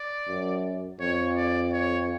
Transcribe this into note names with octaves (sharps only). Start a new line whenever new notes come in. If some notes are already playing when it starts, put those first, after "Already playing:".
Already playing: D5
F#2
F2 C#5
D5
C#5